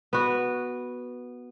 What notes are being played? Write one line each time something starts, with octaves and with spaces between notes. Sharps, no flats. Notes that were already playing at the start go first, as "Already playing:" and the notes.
B3 F#4